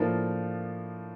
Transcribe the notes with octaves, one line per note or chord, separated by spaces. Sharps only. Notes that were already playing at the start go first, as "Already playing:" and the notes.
Already playing: A2 F3 A#3 D4